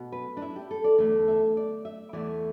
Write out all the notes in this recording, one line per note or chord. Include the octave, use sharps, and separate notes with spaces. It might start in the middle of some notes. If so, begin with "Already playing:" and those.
Already playing: B2
B4
D4
E4
G4
A4
D5
E2 D3 A3 D5
E5
D5
E5
E2 E3 A3 D5